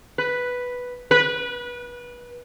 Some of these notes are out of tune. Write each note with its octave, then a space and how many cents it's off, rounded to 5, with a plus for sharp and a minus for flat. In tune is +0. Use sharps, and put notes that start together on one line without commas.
B4 +0
B4 -25